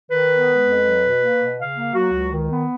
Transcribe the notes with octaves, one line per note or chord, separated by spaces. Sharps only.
D#3 B4
B3
G#3
F2
F#3
B2
A#3
B2
C#3 F5
A#3
F#3 F#4
C#2
D#3
B3